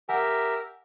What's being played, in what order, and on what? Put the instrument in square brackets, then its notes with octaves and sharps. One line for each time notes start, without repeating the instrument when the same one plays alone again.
[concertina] G4 A#4 E5 [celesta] F#5 G#5